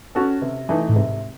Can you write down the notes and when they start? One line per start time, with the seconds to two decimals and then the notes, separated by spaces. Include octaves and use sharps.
0.15 C#4 F#4 A4
0.42 C3
0.69 E3 A3 D#4
0.89 A2
0.95 G#2 C3